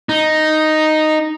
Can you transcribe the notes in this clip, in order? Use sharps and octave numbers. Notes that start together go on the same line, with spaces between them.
D#4